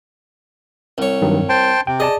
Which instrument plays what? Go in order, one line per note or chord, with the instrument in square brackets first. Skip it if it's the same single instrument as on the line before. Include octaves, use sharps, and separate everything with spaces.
[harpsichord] C2 C#5
[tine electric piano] G2 D#3 F#3
[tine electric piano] C5 [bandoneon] G5 A5 C6
[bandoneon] C3 [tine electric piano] G5
[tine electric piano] G#4 D5 A5 [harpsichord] D#5